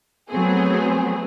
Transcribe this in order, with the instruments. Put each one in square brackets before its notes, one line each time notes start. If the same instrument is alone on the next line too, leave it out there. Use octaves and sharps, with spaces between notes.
[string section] F#3 A3 B3 C4 G#4